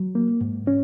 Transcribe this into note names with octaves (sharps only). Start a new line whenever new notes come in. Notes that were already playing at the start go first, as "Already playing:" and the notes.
Already playing: F#3
A#3
G#2
C#4